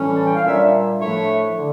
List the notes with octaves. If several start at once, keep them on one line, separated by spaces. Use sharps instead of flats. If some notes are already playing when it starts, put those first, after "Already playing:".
Already playing: A2 E3 G3 C#4
A5
G5
F5
A#2 G3 D4 C#5 E5
A2 F3 A3 D4 C#5 E5
D3